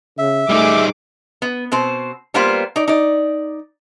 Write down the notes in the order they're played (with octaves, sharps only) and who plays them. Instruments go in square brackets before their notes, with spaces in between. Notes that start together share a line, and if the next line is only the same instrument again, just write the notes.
[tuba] C#3 [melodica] E5
[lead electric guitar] G3 D#4 [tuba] A3 [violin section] G#4 D6
[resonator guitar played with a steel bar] B3
B2 C4 C5
G3 A#3 B3 F4 B4 C5
D#4 D5
D#4 D5